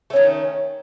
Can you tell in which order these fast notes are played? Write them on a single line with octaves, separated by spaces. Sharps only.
A3 C#4 D#3